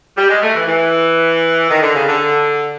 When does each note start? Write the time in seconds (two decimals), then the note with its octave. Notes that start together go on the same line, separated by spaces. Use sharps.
0.17 G3
0.30 G#3
0.42 A3
0.55 E3
0.68 E3
1.70 D#3
1.81 D3
1.95 C#3
2.07 D3